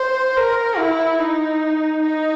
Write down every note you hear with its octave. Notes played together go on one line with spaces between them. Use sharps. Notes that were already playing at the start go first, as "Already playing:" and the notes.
Already playing: C5
A#4
E4
D#4
D#4